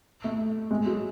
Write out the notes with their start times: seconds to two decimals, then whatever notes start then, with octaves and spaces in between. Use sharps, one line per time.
0.24 A3
0.71 G#3
0.86 F#3